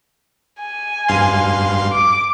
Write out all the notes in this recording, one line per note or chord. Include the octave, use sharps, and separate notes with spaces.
G#5
G2 F5 C6
D6